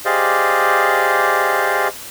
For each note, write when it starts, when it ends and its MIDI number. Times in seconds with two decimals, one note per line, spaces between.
0.05 1.88 67
0.05 1.88 68
0.05 1.88 72
0.05 1.88 74
0.05 1.88 75
0.05 1.88 77